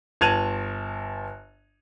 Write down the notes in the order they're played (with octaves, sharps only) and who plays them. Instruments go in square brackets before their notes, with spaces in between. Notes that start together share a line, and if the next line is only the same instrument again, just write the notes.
[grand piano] G1 A5 G#6 D#7 F7 F#7